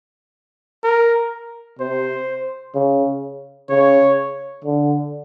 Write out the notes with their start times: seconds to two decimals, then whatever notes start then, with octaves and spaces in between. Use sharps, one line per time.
0.84 A#4
1.79 C3 C5
2.75 C#3
3.69 C#3 C#5
4.65 D3